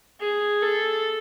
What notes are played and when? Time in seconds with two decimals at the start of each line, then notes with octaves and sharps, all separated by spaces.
0.20 G#4
0.62 A4